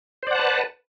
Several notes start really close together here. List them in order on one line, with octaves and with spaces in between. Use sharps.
C5 D5 F#5 A5 B4